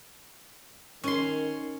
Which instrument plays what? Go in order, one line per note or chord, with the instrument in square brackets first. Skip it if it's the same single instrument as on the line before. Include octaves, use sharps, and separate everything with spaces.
[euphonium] D#3 [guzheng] C#4 C6